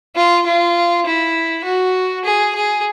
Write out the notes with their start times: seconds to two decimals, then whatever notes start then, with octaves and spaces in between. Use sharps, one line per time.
0.16 F4
0.46 F4
1.06 E4
1.65 F#4
2.25 G#4
2.55 G#4